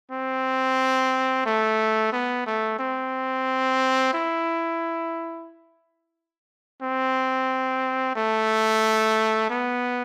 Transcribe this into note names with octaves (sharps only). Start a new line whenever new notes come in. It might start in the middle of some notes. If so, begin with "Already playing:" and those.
C4
A3
B3
A3
C4
E4
C4
A3
B3